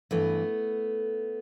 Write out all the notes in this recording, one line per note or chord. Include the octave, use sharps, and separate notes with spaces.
G2 E3 A3 B3